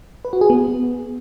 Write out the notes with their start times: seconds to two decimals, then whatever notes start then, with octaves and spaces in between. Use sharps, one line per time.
0.25 B4
0.33 F#4
0.41 G#4
0.50 B3